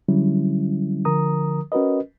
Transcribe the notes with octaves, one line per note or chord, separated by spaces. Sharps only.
D3 F#3 G3 C#4 E4
D3 F3 A#4 A#5 D#6
C#4 F#4 A#4 B4 D#5